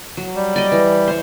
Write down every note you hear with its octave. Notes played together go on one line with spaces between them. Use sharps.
F#3
G3
D5 D#5
E3
C5 C#5